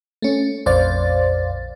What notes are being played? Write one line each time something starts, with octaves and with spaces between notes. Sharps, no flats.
A3 C#4
A#1 F2 C5 D5 F5 A6